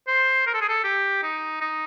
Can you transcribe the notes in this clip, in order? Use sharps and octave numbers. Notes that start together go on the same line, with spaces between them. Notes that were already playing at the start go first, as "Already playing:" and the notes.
C5
A#4
A4
G#4
A4
G4
D#4
D#4